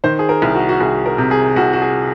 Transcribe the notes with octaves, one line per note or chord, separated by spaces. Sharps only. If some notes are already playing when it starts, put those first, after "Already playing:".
D#3 C5
G#4
A#4
C2
F#4
F#4
C2 G#4
A#4
C3
G#4
C2 F#4
F#4
G#4